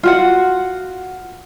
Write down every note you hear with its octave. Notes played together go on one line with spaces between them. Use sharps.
F4 F#4 F#5